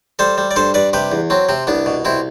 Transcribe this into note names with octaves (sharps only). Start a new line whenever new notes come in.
G3 A4 C5
G3
D5
G2 A4 C5
G2 B4 D5
C3 G4 B4
E2
F#3 C4
C3 C4
C2 B3 D4
B2
C2 C4 E4